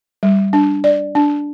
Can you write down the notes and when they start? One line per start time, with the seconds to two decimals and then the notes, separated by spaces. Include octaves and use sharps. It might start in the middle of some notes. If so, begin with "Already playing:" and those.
0.23 G3
0.53 D4
0.84 D5
1.15 D4